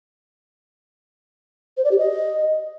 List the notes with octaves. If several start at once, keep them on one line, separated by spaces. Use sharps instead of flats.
C5
D5
G4
D#5